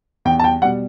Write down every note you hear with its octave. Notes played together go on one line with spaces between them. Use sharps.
E2 G5
A5
G5
B2 G3 F#5